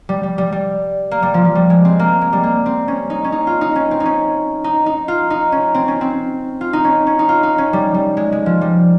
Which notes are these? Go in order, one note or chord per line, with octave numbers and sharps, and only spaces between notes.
G3
G3
G3
G3
A#3
G3
F3
F3
G3
G#3
C4
A#3
G#3
G3
A#3
C4
C#4
D#4
C#4
D#4
F4
D#4
C#4
C4
D#4
C#4
D#4
D#4
F4
D#4
C#4
C4
C#4
C4
F4
D#4
C#4
C#4
D#4
F4
D#4
C#4
G3
G3
G#3
G#3
F3
G3